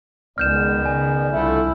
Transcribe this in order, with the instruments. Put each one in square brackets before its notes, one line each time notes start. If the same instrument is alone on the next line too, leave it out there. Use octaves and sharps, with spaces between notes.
[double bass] C#2 G#3 [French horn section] D#3 B3 D5 [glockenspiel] F6 G6 E7
[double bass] C#3 [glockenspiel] G#5
[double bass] C2 E4 [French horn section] D3 F3 A3